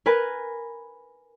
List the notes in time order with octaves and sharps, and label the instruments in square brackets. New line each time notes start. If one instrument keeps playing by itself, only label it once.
[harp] A#4 B4 G#5